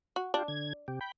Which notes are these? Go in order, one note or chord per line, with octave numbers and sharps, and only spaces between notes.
F#4
D4 F4 G4
D3 G#6
C3 G4
G5 B5